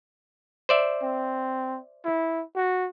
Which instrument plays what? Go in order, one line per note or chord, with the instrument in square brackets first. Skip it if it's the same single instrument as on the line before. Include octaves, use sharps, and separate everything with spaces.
[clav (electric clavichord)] C5 D5 E5
[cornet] C4
E4
F#4